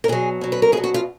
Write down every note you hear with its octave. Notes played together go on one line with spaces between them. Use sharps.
A#4
B2 F#3 G#4
B2 F#3
B4
A#4
B2 F#3 G#4
F#4
F4